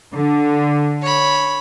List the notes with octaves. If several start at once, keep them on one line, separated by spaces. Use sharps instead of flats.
D3
C#5 B5